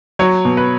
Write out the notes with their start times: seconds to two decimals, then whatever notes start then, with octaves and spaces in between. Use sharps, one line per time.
0.19 F#3 C#5
0.45 B2
0.57 B4